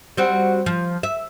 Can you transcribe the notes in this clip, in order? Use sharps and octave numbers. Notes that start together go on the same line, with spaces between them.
G3 C4 F#4
F3
E5